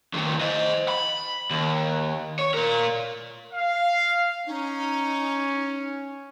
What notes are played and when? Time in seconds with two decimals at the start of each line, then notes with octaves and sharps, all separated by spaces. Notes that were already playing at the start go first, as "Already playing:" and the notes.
0.13 F2 D#3
0.41 C5 D#5
0.88 B5
1.50 D#2
2.39 C#5
2.54 A#2 A#4
3.53 F5
4.47 C#4 D#4